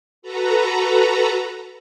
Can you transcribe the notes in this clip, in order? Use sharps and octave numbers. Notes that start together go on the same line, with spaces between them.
F#4 A4 B4 A#5